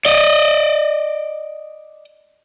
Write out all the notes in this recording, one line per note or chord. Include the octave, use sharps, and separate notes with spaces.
D5 D#5